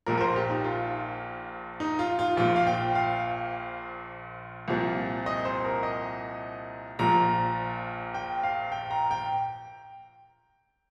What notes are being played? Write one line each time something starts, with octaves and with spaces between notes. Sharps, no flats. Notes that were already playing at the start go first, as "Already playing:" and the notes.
A#1 A#2 F3 A#4
A#4
C5
G4
D#4
F4
D#4
F4
F4
A#1 A#2 F3 F4
F5
G5
F5
C2 A#2 F3
D#5
C5
A#4
D#5
A#1 A#2 F3 A#5
G5
F5
G5
A#5
G5